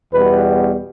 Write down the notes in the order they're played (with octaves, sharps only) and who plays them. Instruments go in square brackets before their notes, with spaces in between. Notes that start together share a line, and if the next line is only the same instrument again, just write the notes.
[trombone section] E2 B2 G3 B3 B4